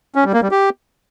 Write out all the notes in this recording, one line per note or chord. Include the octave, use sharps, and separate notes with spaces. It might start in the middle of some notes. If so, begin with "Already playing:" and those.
C#4
G3
A#3
G3
G4